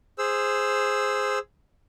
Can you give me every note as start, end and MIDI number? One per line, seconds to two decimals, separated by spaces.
0.18 1.39 68
0.18 1.39 72
0.18 1.39 88